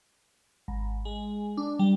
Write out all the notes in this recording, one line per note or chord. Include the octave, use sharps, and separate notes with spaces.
G#1
G#3
D4
G3